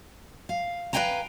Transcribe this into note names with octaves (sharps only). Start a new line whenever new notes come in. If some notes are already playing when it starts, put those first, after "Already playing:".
F5
B4 D5 F5 G5 G#5 A#5